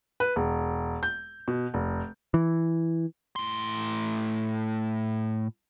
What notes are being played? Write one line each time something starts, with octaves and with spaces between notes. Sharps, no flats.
B4
E1
G6
B2
F1
E3
A2 C6